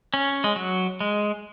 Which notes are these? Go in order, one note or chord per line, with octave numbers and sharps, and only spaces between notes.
C#4
G#3
F#3
G#3